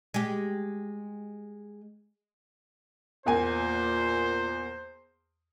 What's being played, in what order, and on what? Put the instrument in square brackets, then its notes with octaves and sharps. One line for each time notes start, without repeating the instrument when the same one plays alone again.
[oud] G#3 G4
[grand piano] E2 A#3 G#5 [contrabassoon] A#2 [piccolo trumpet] C5